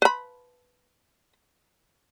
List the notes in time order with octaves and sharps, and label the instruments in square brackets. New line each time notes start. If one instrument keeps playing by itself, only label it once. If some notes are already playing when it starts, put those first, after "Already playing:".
[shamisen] B4 B5